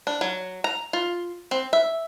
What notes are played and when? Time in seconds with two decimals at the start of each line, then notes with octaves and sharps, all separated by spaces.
0.07 D4
0.21 F#3
0.64 A#5
0.93 F4
1.51 C4
1.73 E5